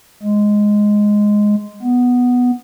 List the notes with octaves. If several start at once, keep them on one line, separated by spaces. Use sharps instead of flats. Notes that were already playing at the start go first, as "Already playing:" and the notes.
G#3
B3